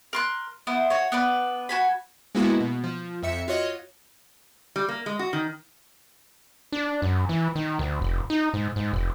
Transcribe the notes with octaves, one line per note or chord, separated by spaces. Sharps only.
A#4 C6 F#6
B3 E4 C5
F#4 C#5
B3 D4 B4
F#4 G#5 B5
G#3 A#3 B3 E4 F#4
B2
F3
F2 E5 C#7
F4 F#4 C#5 D#5
G3
A#3
G#3
F#4
D#3
D4
F#2
E3
D#3
D2
F1
D#4
G#2
G#2
F1